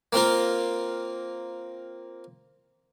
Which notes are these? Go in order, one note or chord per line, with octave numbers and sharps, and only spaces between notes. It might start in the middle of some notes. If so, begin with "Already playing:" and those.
A#3 C4 F4 A#4